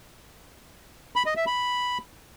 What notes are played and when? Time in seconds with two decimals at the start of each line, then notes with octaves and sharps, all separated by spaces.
1.16 B5
1.26 D#5
1.36 E5
1.47 B5